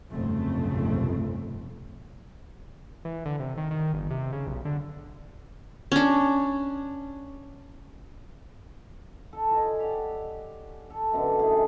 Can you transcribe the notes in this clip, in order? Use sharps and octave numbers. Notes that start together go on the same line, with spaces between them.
F1 B1 G2 C#3 A3 C4
E3
D3
C3
D#3
D#3
G1
C3
C#3
B1
D3
C#4 D4
A4
F4 D5 D#5 G#5
G4 C#5 D5 F#5
A4
F#2 B2 D3
A3 D#4 E4 G#4